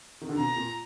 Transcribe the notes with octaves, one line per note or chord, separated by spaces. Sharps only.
D#3
D3
B2 A#5
A#2